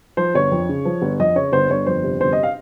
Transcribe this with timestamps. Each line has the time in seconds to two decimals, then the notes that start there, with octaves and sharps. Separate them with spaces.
0.17 F3 C5
0.35 G1 C#5
0.51 F2
0.69 C#3
0.85 F3
1.02 G1
1.19 F2 D#5
1.36 C#3 C#5
1.53 G1 C5
1.70 G1 C#5
1.86 F2 C5
2.03 C3
2.20 G1 C5
2.33 D#5
2.43 F5